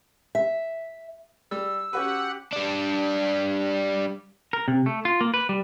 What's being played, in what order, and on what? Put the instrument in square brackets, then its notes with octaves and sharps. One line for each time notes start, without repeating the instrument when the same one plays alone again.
[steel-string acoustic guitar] E5
[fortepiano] G3 [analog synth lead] E6
[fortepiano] C#4 F#4 B4 [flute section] G4 [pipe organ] F#5
[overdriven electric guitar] G3 D4
[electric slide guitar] A#4
C3
A3
F4
A#3
B4
G3